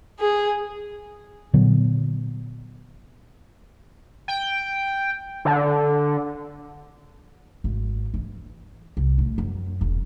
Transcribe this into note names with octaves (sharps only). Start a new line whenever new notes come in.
G#4
A#2 D3 F#3 B3
G5
D3
G#1
E3
C2
A2
F#2
E1